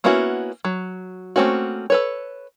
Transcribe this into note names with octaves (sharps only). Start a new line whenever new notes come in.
A#3 B3 C#4 E4 F#4
F#3
A3 A#3 C4 C#4 F#4
A4 B4 C#5